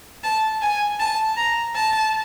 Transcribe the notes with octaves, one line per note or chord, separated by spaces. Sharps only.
A5
G#5
A5
A#5
A5